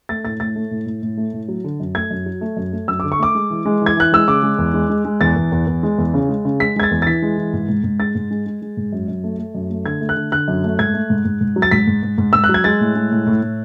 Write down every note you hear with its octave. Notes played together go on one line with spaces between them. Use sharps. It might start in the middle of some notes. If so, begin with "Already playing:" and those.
A3 A6
A2 A6
A2 A6
A3
A2
A2
A2
A3
A2
F#3
D3
F#2
A3 G#6
F#2
F#3
A3
F#2
A3
F#2 E6
D6
D3
C#6
A3 D6
G#3
E3
G#3
E3 G#6
E3 F#6
G#3 E6
C#3 D6
G#3
E2
G#3
G#3
G#3
E2 A6
E2
E2
E2
G#3
E2
C#3
G#3
C#3
G#3 B6
G#3 G#6
A6
E2
A6
E3 B6
G#3
E3
G#2
G#2
G#2
G#3 A6
G#2
G#3
G#3
G#3
G#2
F#2
F#2
A3
A3
F#2
A3
D3 G#6
A3
F#6
D3
D3 F#6
F#2
A3
G#2 G#6
A3
G#2
G#2
G#2
F#3
A6
G#2 B6
G#2
G#2
G#2
G#2 E6
F#6
F#3
G#6
G#3 A6
A2
G#3
A2
A2
A2